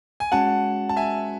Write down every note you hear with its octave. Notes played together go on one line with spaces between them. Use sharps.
G#5
G#3 C#4 F#4 F#5 A5
A5
E5 G#5